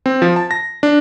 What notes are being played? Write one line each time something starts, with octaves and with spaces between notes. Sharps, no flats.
C4
F3
A5
A#6
D4